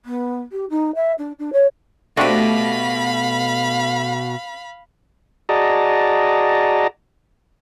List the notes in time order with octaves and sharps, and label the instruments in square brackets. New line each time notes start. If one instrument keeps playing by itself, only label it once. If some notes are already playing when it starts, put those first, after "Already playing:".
[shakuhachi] B3
G4
D#4
E5
D4
D4
C#5
[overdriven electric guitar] B2 [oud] A3 G4 [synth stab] C4 D4 F#4 [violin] F5 B5
[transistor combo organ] F#4 G#4 D5 D#5 A5 A#5